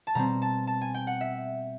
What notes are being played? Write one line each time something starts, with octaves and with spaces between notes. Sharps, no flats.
A5
B2 G3 C4 A#5
A5
A5
G#5
G5
F#5
E5